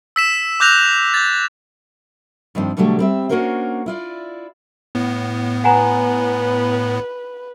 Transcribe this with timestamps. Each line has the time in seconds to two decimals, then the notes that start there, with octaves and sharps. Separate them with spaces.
0.16 E6 B6 E7
0.60 D6 F#6 G6 A#6 F7
1.14 G6 A6
2.55 G2 D#3 F3 C4
2.77 B2 D3 F#3 G3 A3
2.99 G3 C4 E5
3.29 A#3 C#4 D4 F#4 A#4 C5
3.86 E4 F4 D5
4.95 A2 B3
5.64 B4 F#5 G#5 A#5